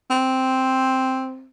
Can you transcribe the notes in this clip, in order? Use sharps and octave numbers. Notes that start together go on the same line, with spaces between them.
C4